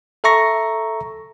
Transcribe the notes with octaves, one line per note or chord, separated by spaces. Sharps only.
A4 E5 A#5 C#6 A#6